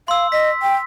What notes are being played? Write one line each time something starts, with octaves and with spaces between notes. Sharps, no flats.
F5 C6 E6
D#5 B6
G5